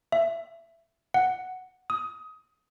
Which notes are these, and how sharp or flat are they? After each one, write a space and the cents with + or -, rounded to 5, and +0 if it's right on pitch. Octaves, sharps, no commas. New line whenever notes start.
E5 +15
F#5 +0
D#6 +20